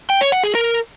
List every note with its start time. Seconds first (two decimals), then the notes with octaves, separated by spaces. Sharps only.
0.10 G5
0.21 C#5
0.32 F#5
0.44 G#4
0.55 A#4